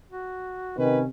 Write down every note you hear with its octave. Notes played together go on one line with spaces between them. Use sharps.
F#4
C3 D#3 C#4 B4